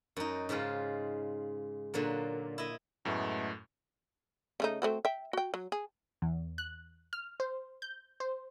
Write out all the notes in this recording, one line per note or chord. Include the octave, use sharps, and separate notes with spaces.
F#2 D#4
G#2 C#3 G#3 F4
A#2 D3 F#3 A#3
E4 D#5
F#2 A2 G#3 A3 B3
C#3 A3 D#4
A3 C4 F#4
E5 G5
F#4 G5
F#3
G#4
E2
F#6
F6
C5
G6
C5